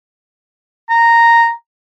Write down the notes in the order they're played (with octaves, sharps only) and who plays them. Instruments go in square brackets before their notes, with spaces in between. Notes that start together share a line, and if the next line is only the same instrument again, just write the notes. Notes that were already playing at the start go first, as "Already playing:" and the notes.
[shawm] A#5